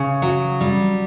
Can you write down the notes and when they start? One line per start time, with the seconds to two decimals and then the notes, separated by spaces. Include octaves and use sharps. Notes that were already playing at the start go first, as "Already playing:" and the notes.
Already playing: C#3
0.22 F#3
0.61 G3